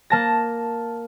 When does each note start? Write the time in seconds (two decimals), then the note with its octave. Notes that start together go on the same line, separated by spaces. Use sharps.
0.10 A#3 A5 A#6